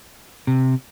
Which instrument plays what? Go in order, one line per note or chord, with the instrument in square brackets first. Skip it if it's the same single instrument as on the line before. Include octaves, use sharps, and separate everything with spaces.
[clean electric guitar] C3